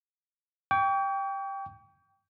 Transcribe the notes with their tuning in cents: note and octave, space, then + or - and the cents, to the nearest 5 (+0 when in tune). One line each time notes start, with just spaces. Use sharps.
G5 +5 C#6 +45